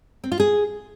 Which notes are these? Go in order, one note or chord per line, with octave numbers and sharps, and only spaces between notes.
C4
F4
G#4